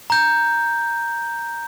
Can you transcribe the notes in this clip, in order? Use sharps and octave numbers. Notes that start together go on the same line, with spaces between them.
A#5 G6